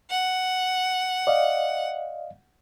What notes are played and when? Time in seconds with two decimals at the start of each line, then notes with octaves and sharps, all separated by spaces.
0.10 F#5
1.27 D5 D#5 F5